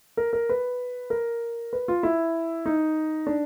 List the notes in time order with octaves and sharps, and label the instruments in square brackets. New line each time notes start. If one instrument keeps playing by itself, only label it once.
[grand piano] A#4
A#4
B4
A#4
B4
F4
E4
D#4
D4